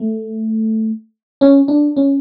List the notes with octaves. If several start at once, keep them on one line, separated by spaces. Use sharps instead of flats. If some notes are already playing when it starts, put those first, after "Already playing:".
Already playing: A3
C#4
D4
C#4